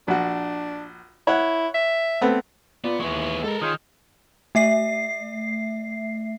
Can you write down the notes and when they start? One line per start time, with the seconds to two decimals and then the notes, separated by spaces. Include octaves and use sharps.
0.08 A#1 D4 F#4
1.27 E4 C#5 F#5
1.74 E5
2.21 A3 B3 C4
2.84 B3 F4 D5
3.00 D#2 E3 G#3 B3 C#6
3.44 G#3 A4 A#4
3.62 D#3 F4 G#4 C#5 D#6 F6 G6
4.55 A3 E5 C7